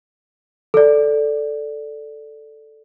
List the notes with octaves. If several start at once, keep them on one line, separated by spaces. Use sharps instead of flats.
A4 D5